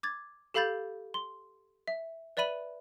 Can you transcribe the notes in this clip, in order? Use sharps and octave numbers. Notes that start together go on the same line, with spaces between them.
D6 G#6 A6
G4 A4 F5 B5 G6 A6
C6
E5
B4 D5 E5 B5 D#7 F#7